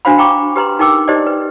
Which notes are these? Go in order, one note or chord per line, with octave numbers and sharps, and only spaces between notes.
D4 F#4 C5 F5 B5
G5 A#5 C#6 D6
G4 B4 A#5 C6
D#4 A#4 G5 D6 E6
D#4 G4 C5 D5 D#5
B4